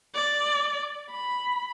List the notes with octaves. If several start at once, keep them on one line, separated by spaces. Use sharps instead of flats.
D5
B5